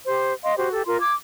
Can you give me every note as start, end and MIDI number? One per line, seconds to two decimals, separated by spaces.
0.06 0.33 67
0.06 0.33 72
0.44 0.54 75
0.44 0.54 77
0.44 0.54 84
0.57 0.72 66
0.57 0.72 67
0.57 0.72 72
0.73 0.83 67
0.73 0.83 69
0.87 0.99 65
0.87 0.99 70
0.87 0.99 84
1.00 1.14 86
1.00 1.14 92